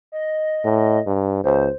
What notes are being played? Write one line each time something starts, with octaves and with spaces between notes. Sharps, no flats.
D#5
A2
G2
C#2 C5